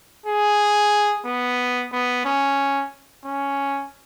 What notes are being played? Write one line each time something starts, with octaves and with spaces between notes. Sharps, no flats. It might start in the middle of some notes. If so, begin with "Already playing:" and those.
G#4
B3
B3
C#4
C#4